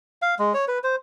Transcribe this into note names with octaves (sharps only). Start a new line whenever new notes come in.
F5
G#3
C#5
B4
C5